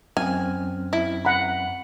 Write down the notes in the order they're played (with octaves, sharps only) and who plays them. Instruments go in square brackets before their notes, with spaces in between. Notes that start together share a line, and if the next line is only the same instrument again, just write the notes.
[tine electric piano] F#2 C4 F6 [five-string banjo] G#5
[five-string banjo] E4
[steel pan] F#5 A#5 B5